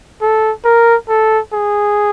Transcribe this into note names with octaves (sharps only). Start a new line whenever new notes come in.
A4
A#4
A4
G#4